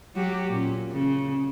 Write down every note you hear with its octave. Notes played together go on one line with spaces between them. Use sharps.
F#3 F#4 G4
A#2 C#4
C#3